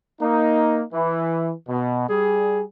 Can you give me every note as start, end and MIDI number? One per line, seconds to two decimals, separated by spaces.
0.21 0.83 58
0.21 0.83 63
0.94 1.52 52
1.68 2.05 47
2.09 2.63 55
2.09 2.63 68